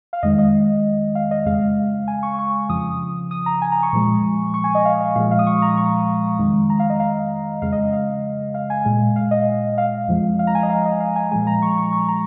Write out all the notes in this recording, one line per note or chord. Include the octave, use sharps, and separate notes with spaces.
F5
F2 D#3 G#3 D#5
D#5
F5
D#5
F2 C#3 G#3 F5
G#5
C#6
C#6
F2 C#3 F3 D#6
D#6
A#5
G#5
A#5
C#6
A#2 F3 G#3
C#6
G#5
D#5
F5
D#5
A#2 F3 G#3 F5
F5
D#6
C#6
A#5
C#6
F2 D#3 G#3
A#5
F5
D#5
F5
F2 C#3 G#3 F5
D#5
F5
F5
G#5
A#2 G#3
F5
D#5
F5
F2 F3 G#3
F5
A#5
G#5
D#5
F5
D#5
F5
G#5
A#2 F3 G#3 G#5
A#5
C#6
C#6
C#6
A#5